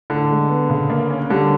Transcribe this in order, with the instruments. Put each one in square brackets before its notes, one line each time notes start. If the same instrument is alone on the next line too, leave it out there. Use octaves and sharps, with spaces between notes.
[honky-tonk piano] A2 [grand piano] D3
[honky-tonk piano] G#3
B3
C#3
A#3
C#4
[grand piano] D3 [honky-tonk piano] G3